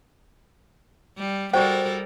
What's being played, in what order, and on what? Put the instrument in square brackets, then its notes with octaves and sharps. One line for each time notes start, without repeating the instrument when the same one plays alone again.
[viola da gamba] G3
[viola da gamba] G3 A4 A#4 [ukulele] F#4 G5 [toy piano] C5 D5